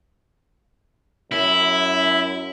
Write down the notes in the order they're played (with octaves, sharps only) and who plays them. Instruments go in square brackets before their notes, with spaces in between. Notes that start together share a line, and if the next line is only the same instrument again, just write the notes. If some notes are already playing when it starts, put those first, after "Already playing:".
[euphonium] F#2 [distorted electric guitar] E4